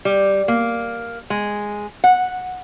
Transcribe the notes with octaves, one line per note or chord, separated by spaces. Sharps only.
G3
A#3
G#3
F#5